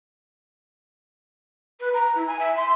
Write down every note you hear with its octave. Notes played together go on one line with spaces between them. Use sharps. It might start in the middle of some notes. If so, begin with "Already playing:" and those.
B4
A#5
E4
G#5
E5
C6